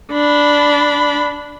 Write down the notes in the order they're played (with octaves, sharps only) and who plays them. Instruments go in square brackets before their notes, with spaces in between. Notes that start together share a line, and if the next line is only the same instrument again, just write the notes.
[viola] D4 B5